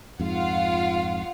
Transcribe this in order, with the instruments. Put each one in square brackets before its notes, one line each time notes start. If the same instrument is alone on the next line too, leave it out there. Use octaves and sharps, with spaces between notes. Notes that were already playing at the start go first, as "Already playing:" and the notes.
[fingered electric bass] F2 G#2 [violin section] F4 F5 F#5